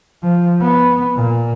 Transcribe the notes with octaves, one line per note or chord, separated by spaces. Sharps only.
F3
B3
A#2